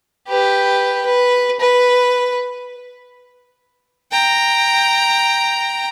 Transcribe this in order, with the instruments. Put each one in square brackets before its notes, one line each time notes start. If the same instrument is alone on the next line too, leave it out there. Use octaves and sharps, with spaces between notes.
[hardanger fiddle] G4 B4
B4
B4
[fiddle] G5 A#5